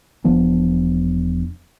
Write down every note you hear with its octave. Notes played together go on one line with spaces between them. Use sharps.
E1 F3 B3 D4